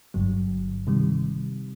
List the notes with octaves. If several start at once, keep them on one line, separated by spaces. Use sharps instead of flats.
G1 G2 D3 F#3
C3 D#3 G3